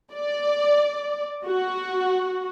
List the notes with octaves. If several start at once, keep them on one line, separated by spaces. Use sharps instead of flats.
D5
F#4